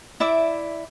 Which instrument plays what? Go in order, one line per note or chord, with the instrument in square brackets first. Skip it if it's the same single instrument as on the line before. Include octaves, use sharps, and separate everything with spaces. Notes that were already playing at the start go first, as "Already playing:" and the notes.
[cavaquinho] E4 D5 E5 D6